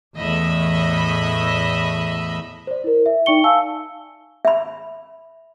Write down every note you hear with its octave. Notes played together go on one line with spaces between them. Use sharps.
E2 A2 D#5 E5 B5
C5 D5
E4 A#4
E5
D#4 D5 G5 C#6 C#7 G7
F5 G#5 A5 E6
E5 B5